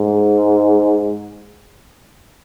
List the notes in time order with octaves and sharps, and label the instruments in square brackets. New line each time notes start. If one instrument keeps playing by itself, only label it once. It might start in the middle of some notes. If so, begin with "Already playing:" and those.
Already playing: [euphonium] G#2